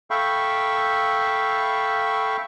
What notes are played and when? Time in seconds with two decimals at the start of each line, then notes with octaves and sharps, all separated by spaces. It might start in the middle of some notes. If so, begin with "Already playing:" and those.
0.10 A4 E5 F5 G5 B5 C#6